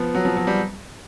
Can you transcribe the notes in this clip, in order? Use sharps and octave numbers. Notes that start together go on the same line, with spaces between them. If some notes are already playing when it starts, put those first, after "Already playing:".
Already playing: F3 B3
F#3
F3
F#3
G3